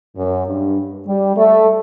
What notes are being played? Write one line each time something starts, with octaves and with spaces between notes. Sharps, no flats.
F#2
G2
G3
A3